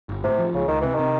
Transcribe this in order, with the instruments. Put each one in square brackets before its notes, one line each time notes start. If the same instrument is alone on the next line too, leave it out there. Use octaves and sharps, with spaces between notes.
[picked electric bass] G1
[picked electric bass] A2 [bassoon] C3
[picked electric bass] F3
[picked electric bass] C#2 [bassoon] C#3
[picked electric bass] C#2 [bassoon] D#3
[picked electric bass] C3 [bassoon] E3
[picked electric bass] C3 [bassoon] D#3